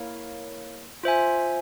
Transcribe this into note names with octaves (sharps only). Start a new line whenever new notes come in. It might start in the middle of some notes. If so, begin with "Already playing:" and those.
Already playing: A#3 E4 A#4 C#5 F5
F4 C5 E5 G#5